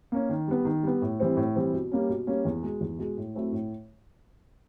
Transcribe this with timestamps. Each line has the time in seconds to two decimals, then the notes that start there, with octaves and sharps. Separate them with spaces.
0.12 A#3 C#4
0.29 D#3
0.48 G3 B3
0.65 D#3
0.83 G3 B3
1.02 A2
1.20 E3 G3 C4
1.37 A2
1.56 E3 G3 C4
1.73 B2
1.92 G3 A#3 C#4
2.09 B2
2.27 G3 A#3 C#4
2.45 E2
2.63 B2 G#3
2.81 E2
2.99 B2 G#3
3.17 A2
3.35 F#3 A3 C4 E4
3.52 A2